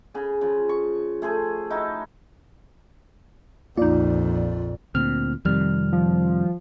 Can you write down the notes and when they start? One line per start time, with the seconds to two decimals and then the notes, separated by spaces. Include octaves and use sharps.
0.14 C#3 G#4
0.41 C#3 F3
0.69 C#6
1.22 A3 G#4 C5 G#5
1.70 D#4 E4 F#4
3.77 A#1 F2 A#3 D#4 F4 D5
4.95 D2 A#2 C4 F6
5.45 F2 C3 D#3 G3 F6
5.92 F3